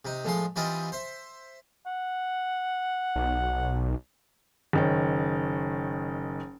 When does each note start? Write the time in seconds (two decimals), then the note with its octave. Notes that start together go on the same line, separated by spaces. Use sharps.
0.05 C3 D#4
0.25 A2 F3 G#3 C6
0.56 E3 G3 C4 D#4 F4 D#5
0.92 C5 E5
1.87 F#5
3.16 B1
4.73 F#1 D#3 C#5